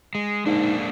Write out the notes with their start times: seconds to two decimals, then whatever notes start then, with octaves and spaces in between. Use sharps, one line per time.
0.15 G#3
0.46 G#2 G#3 A#3 D4